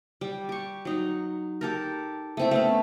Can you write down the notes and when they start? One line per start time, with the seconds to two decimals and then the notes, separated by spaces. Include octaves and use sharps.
0.21 G3
0.49 G4 C#6
0.85 F#3 D#4
1.61 G4 A4 A#4
2.37 A3 C4 E4
2.51 A3 B3 C#4